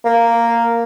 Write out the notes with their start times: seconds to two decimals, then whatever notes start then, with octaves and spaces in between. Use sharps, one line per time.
0.05 A#3